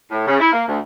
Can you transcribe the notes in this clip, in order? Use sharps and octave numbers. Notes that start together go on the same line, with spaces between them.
A2
C#3
E4
A#3
D2